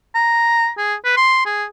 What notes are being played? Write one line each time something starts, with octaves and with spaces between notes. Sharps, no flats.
A#5
G#4
B4
C6
G#4